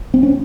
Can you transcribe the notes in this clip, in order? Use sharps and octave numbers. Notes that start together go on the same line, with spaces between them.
C4
C#4